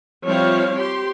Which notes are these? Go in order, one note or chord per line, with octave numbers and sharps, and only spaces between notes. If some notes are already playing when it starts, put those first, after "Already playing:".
F3 G3 C4 E4 C#5 F5
G4 C6